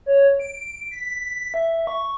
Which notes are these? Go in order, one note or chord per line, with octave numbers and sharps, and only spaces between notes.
C#5
D7
B6
E5
C#6